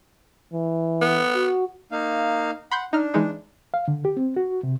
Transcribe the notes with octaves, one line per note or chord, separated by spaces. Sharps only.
E3
B3
F#4
A#3 D#4 F5
F#5 B5 C6 G6
D4 D#4 F6
E3 G#3 D#4
F5
D3
G4
C4
F#4
C3